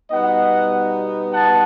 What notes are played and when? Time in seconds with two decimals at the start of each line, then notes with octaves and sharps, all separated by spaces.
0.11 B2 G3 B3 D#4 D#5 F#5
1.33 F#5 A5